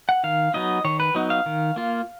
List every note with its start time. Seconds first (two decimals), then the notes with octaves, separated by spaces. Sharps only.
0.09 F#5
0.24 D#3 F5
0.54 F#3 B3 D#4 D#5
0.84 D#3 C#5
1.00 B4
1.15 F#3 B3 D#4
1.30 F5
1.46 D#3
1.76 A#3 F4